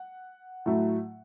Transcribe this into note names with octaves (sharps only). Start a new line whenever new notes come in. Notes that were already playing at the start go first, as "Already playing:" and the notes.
Already playing: F#5
A2 F#3 A3